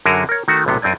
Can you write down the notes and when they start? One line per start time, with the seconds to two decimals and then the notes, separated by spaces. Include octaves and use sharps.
0.05 F#2 D3 F#4 G#4 A#4
0.29 A#4 C#5
0.48 D#3 A3 F#4 F#5
0.66 B1 A2 C3 B3
0.82 F#2 C4 D5 G#5